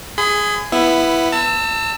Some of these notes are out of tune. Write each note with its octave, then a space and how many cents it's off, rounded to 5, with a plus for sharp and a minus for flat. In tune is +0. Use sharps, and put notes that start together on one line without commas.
G#4 +0 B5 +45
B3 +0 E4 +10
A5 +35 E6 +0